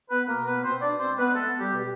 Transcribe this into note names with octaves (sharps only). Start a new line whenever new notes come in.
B3 B4
B2 A#3 A#4
B3 B4
B2 C4 C5
D4 D5
G#3 C4 C5
B3 B4
A3 B3 A4
G3 G4
B2
G4